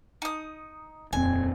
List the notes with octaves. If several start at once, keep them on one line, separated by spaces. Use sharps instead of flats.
D#4 D#6
D#1 F2 C4 G#5